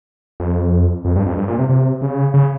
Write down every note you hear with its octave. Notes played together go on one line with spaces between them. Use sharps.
F2
F2
G2
F2
G2
A#2
C3
C3
C#3
C#3